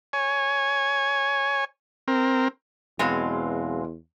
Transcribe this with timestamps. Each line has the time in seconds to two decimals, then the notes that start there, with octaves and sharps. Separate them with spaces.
0.13 C#5 G#5
2.08 C4 A#4
2.99 E2 B2 F#3 G#3 C4 F5